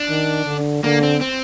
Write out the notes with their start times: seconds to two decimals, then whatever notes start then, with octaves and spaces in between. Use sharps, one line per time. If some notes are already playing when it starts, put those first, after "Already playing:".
Already playing: D4
0.09 D#3
0.46 D3
0.84 D3 A#3
1.03 C4
1.21 C4